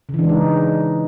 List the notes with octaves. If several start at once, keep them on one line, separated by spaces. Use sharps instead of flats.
C#3
E3
D4
G#3
D#4